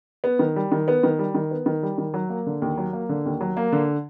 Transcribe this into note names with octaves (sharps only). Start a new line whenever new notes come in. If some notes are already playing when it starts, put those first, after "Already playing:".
B3
D#3
G3
D#3
B3
D#3
G3
D#3
B3
D#3
G3
D#3
F#3
A#3
D3
D#2
F#3
A#3
D3
D#2
F#3
A#3
D3